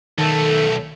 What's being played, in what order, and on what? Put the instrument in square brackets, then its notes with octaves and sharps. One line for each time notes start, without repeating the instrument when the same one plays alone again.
[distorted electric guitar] B1 A3 [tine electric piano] D#3 [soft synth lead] A4